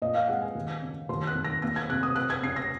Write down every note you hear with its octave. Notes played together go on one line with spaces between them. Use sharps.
A#2 D#5
F5
G#3 F#5
G#5
D#2
C#3
D#2 C6
F#6
D#3
A#6
A#3 A#6
G#6
C3 F#6
D#6
C4 F#6
G#6
C#3 C7
A#6